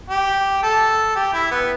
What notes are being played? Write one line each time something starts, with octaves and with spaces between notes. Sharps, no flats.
G4
A4
G4
E4
B3